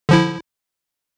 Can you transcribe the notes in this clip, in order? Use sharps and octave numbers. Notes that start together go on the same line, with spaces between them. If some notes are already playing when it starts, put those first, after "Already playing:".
D3 F3 E4